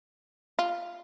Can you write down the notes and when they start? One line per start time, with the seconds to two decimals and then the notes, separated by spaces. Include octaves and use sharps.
0.59 F4